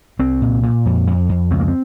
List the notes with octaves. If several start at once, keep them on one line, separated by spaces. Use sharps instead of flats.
C2 C4
A#2
A#2
F2
F2
F2
C#2 C4
A#3
C4